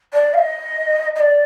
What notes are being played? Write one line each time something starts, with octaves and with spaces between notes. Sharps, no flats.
D5
F5
D#5
D#5
D5